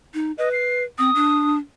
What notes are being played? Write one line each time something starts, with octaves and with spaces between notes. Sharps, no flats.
D#4
B4 D#5
C7
C4 D#6
D4